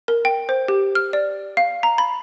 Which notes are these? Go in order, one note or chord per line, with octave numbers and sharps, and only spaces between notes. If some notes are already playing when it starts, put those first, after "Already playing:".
A#4
G5
C5
G4
F6
D5
F5
A#5
B5